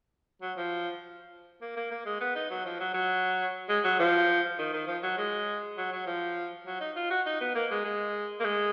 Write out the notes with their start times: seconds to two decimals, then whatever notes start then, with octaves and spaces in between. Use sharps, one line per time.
0.42 F#3
0.57 F3
1.62 A#3
1.76 A#3
1.91 A#3
2.06 G#3
2.21 B3
2.35 D#4
2.50 F#3
2.65 F3
2.80 F#3
2.94 F#3
3.69 G#3
3.84 F#3
3.99 F3
4.59 D#3
4.73 D#3
4.87 F3
5.03 F#3
5.18 G#3
5.77 F#3
5.92 F#3
6.07 F3
6.66 F#3
6.80 D#4
6.96 F4
7.10 F#4
7.26 D#4
7.41 B3
7.55 A#3
7.71 G#3
7.85 G#3
8.40 A#3
8.45 G#3